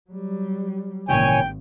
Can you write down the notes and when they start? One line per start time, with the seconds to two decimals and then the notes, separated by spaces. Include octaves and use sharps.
0.10 F#3 G3
1.09 G#1 A#2 C#3 E3 C#5 G5 G#5